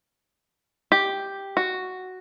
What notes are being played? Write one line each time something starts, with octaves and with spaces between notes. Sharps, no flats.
G4
F#4